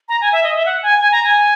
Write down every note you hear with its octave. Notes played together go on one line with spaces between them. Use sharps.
A#5
G#5
E5
D#5
E5
F#5
G#5
G#5
A#5
G#5